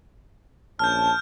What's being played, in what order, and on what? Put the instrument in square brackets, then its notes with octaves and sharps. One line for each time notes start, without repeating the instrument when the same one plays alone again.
[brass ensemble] A#1 C#4 A5 [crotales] F6 G6